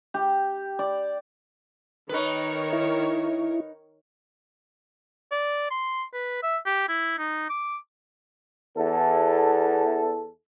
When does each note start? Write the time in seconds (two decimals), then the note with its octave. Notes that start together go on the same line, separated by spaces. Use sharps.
0.14 G4
0.79 D5
2.09 D#3 D#4 A#4 B4 C#5
2.73 E4
5.31 D5
5.70 C6
6.13 B4
6.43 E5
6.66 G4
6.88 E4
7.18 D#4
7.50 D6
8.77 E2 A4